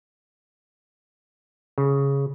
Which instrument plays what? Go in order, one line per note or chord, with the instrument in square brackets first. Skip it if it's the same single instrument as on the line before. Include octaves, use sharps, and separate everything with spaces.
[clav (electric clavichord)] C#3